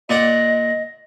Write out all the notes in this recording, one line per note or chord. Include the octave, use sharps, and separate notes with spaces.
A#2 D5 D#5 F#5